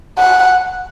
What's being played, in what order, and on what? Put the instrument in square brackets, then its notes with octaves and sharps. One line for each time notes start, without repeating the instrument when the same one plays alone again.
[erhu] F#5